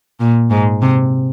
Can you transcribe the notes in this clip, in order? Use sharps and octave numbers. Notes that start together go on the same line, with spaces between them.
A#2
G#2
C3